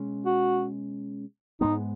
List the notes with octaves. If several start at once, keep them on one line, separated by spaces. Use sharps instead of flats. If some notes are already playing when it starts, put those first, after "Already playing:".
Already playing: B2 G#3 C#4
F#4
G#2 G#3 B3 D#4